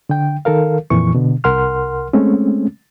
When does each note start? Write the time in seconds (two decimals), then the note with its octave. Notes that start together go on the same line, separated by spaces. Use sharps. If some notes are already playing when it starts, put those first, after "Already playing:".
0.09 D3 G5
0.45 D#3 A4 A#4 F5
0.90 F2 A#2 E3 C#6
1.15 B2 D3
1.44 C2 A#4 F#5 C6 F6
2.13 G#3 A3 C4 C#4